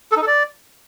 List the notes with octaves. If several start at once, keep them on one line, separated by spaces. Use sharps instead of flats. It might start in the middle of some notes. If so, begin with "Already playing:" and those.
A4
D#4
A4
D5